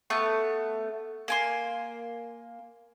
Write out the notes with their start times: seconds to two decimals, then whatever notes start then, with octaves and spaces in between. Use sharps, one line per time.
0.10 A3 B3 C#6
1.28 A#3 G#5 C6